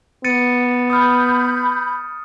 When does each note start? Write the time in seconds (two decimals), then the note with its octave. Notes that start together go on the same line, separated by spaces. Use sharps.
0.24 B3 A6 C#7 D#7
0.90 B5 D#6 F6 G6